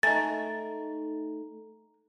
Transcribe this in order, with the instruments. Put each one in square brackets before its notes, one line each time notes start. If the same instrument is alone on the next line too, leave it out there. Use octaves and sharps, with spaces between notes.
[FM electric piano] A3 D#4 [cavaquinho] A#4 G#5 C#6 [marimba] A6